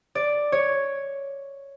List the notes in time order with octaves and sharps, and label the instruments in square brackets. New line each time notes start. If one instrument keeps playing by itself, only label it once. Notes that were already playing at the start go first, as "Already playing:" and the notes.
[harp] D5
C#5